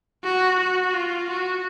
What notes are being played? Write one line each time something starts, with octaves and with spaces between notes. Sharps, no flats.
F#4
F#4
F4
F#4